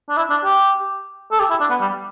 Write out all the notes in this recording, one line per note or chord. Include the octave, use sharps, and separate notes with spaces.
D4
E4
D4
G4
A4
G4
E4
D4
B3
G3